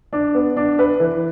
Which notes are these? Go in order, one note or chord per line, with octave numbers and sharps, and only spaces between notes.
D4
B3
D4
B4
E3